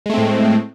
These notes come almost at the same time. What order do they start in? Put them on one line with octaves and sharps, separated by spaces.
G#3 A3 C4 A2